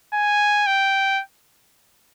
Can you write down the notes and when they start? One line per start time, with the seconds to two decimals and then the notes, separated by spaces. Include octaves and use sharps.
0.13 G#5
0.66 G5